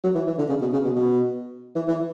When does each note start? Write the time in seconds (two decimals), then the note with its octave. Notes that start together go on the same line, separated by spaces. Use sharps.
0.04 F#3
0.15 E3
0.27 E3
0.38 D3
0.49 C#3
0.61 B2
0.73 C#3
0.84 B2
0.96 B2
1.76 E3
1.88 E3